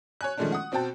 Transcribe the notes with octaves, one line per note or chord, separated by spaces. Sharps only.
C#5 G#5 F#6
D#3 F3 G#3 A3 C#4 D4
F#5 D#6
B2 C4 F#4 G5 A5